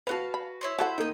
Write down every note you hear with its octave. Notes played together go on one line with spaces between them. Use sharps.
F#4 B4 F5 F#5 A5
B5
E4 C#5 C6
E4 F#4 A4 C5 F#5
A#3 D#4 D#5 G5